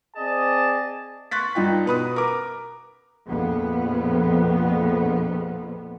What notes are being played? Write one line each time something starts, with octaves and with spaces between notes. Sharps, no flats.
C4 G#4 D5 D#5 A5
C6 C#6 F#6 A6 B6
G2 D#4 F4 G5
B2 B4 B5 D#6
A#4 D6
A#1 F2 B3